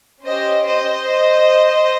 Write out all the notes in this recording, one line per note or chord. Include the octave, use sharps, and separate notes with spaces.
C#4 G4 C5 D#5
C5 D#5